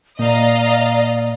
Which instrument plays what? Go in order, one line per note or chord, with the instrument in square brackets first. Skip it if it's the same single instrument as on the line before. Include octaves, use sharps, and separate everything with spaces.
[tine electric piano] A#2 A#3 [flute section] D5 [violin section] D#5 F5 A#5